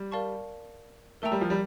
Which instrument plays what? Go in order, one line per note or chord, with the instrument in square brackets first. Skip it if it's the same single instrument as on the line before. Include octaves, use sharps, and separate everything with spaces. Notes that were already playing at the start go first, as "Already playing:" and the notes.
Already playing: [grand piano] G3
[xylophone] A#4 D5 F5 A5 C#6
[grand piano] A3 [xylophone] A#4 E5 G5 A#5 E6
[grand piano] G3
F3
G3